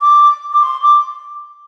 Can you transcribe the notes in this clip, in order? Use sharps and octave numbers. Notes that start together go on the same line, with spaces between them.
D6
D6
C6
D6